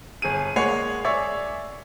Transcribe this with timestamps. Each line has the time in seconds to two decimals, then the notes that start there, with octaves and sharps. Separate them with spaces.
0.22 G1 G#4 D#7
0.56 G#3 A#3 C#5 F#5 C7
1.05 G#4 C#5 D5 E5 C#6